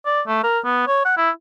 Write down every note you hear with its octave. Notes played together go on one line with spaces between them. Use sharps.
D5
A3
A#4
B3
C#5
F#5
E4